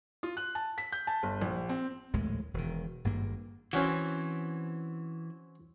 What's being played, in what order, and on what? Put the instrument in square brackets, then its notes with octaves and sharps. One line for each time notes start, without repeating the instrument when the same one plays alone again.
[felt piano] F4
F#6
A5
B6
G6
A5
G1
A#1
C4
[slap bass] A#1 D#2 A2 G#3
E1 D#3
G#1 G2 A#3
[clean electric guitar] E3 [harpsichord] C4 C#4 F#4